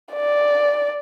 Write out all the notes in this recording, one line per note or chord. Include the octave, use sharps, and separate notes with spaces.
D5